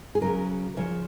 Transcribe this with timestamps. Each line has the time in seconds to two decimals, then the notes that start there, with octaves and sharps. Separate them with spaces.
0.15 G#4
0.21 C#3 F#3 A#4
0.77 C#3 F3 C#5